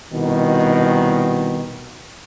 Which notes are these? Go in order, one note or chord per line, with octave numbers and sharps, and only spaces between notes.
C2 B2 D#3